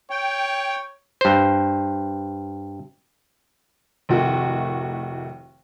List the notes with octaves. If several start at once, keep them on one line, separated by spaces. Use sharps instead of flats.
C#5 G5
G2 C5
F1 A2 D#3 A3 F#4